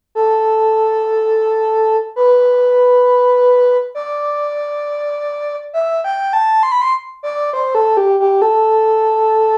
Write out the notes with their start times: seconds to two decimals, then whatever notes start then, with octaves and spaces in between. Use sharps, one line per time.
0.15 A4
2.16 B4
3.95 D5
5.73 E5
6.04 G5
6.33 A5
6.63 C6
6.72 B5
6.81 C6
7.23 D5
7.53 C5
7.75 A4
7.97 G4
8.20 G4
8.42 A4